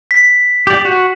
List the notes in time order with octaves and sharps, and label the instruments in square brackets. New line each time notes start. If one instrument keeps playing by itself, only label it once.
[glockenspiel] B6
[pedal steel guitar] G4 D5
F#4